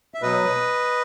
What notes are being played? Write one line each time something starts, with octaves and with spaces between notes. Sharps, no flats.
E5
B2 F#3 B4 D#5